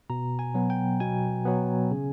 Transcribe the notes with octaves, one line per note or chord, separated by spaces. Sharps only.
B2 A#5
G#5
F#3 B3
G5
B2 G#5
F#3 B3
C#3